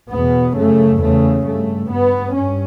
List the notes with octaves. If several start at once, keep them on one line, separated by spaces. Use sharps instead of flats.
E2 B2 B3
F#2 C#3 A3
E2 C#3 A3
G2 A3
G2 B3
G2 C#4